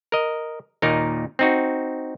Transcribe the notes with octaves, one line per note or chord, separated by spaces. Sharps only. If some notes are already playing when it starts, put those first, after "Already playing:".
A#4 D#5
D#2 A#2 D#4 A#4
C4 D#4 F#4